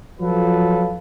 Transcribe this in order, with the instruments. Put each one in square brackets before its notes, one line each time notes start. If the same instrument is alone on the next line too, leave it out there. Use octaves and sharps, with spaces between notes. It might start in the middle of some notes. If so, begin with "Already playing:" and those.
[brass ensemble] F3 F#3 F4 A4 B4